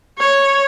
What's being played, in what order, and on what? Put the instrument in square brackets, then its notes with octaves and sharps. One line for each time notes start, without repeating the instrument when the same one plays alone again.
[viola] C#5